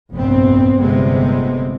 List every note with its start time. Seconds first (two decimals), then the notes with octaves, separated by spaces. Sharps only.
0.12 F1 A#1 G2 B3 C4
0.77 G1 A2 C3 G#3 B3 C4